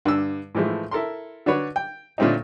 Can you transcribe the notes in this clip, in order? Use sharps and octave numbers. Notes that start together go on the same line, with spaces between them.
G2 D3 E6
A2 E3 F3 G#3 A3
E4 A4 A#4 C6
D3 D4 F#4 B4 C#5
G5
A#2 D3 A3 C4 C#4 D#4